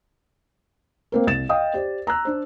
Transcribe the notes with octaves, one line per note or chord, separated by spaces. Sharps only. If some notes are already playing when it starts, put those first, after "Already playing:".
A#3 C4 A#4
C2 A6 E7
D#5 F5 G5 D#6
G4 C5 D5
A#5 E6 F#6
D4 C5